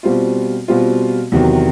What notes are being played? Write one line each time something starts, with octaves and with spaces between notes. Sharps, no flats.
B2 G3 C4 F4
B2 G3 C4 F4
E2 C3 D#3 F#3